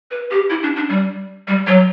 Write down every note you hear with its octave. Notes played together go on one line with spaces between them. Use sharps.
B4
G4
E4
D4
D4
G3
G3
F#3